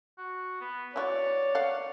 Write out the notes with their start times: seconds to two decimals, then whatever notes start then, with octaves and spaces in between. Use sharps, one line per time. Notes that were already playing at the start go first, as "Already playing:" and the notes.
0.18 F#4
0.61 B3
0.96 E3 F#4 C#5 D5
1.55 F5 F#5